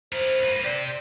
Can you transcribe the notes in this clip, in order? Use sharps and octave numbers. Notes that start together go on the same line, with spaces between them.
E4 A#4 C5
A#3 B4
G4 C5 D5